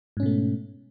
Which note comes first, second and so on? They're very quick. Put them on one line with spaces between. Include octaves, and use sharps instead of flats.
G#2 C#4 B2 A3